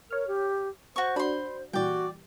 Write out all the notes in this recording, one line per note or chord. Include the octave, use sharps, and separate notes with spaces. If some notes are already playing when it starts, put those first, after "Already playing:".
A#4 C#5 F6
G4
F#4 C5 C#6
D4 F#4 B5 C6
A#2 E3 G3 F#4 D5 G5